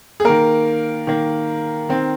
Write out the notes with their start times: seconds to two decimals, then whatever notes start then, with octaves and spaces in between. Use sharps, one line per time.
0.20 G#4
0.25 D#3 A#3 A#4
1.07 D#3 A#3
1.89 D#3 C4